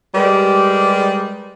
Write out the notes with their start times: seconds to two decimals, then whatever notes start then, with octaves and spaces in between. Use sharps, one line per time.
0.14 G3 G#3 G4 A#4 B4